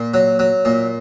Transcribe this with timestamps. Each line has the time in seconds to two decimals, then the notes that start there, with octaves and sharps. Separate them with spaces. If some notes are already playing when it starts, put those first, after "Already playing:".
Already playing: A#2
0.14 F#3
0.39 F#3
0.65 A#2